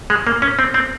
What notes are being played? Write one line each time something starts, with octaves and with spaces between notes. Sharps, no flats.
G#3
A#3
C#4
C4
C4